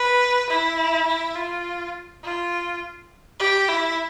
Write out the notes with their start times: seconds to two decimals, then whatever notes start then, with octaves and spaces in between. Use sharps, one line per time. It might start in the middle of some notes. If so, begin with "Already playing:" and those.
Already playing: B4
0.49 E4
1.07 E4
1.36 F4
2.23 F4
3.40 G4
3.69 E4